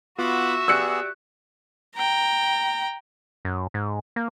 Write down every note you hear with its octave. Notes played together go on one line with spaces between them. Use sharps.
B3 F4 F#4 E5 F#5 B5 D6
B3 G4 G#4 D5 E6 F#6 C#7
G5 A#5
F#2
G#2
A#3